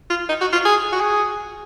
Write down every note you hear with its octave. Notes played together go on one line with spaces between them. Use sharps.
F4
D#4
F#4
F4
G#4
F#4
G#4